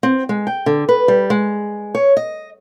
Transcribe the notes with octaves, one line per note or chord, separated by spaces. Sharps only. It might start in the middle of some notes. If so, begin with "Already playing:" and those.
C4
G#3
G5
D3
B4
G3
G#3
C#5
D#5